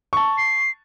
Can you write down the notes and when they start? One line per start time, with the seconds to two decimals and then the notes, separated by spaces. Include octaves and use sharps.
0.13 A5 C#6
0.37 C7